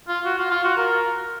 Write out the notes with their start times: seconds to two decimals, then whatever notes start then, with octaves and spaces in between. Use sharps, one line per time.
0.08 F4
0.25 F#4
0.39 F4
0.51 F4
0.64 F#4
0.77 A#4